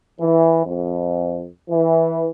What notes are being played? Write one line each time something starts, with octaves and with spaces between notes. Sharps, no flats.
E3
F2
E3